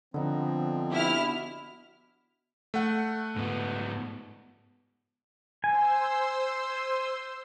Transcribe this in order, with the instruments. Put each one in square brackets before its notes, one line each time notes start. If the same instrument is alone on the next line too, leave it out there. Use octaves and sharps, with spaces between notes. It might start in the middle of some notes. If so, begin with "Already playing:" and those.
[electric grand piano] D3 [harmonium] F3 C4 [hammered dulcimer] B3 D#4
[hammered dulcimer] B2 G4 [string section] E4 F6
[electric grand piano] A3 F#5
[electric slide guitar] G#2 B3
[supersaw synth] C5 C6 E6 [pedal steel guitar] G#5